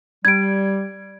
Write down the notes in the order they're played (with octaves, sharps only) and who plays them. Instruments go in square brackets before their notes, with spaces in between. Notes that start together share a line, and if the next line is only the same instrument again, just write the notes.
[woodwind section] G3 [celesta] G#6 D7